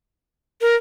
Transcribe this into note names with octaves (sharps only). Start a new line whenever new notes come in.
A#4